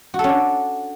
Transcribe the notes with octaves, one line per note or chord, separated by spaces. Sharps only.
F#4
A4
C#4
D4